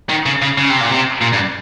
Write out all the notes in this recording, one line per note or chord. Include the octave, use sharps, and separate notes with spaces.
D#3
C#3
C#3
C#3
C3
A#2
C3
A#2
G2